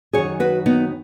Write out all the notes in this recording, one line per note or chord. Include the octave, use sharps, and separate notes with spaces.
F#2 D#3 G#4 C#5
F#4 B4
B3 D#4